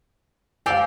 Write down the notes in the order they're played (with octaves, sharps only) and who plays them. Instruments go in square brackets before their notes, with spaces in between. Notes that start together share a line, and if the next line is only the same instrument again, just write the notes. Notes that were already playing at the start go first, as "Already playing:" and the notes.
[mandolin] C4 G4 D5 [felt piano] F5 G#5